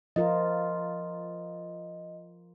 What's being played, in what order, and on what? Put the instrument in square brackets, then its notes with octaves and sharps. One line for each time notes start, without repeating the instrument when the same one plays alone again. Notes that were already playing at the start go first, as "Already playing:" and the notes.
[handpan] F3 F4 A#4 [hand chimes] D#5